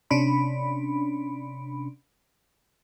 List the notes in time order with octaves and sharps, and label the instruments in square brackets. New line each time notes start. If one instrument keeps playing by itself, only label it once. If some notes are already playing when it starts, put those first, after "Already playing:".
[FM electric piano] C3 C#4 D4 B5